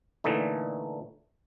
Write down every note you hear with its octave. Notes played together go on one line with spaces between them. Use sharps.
A#2 D3 E3 A3 D#4